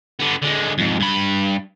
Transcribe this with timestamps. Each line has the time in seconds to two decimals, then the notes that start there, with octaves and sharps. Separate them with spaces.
0.20 D3 B3
0.42 D3 G#3
0.78 F2 G#2
1.00 G2 B5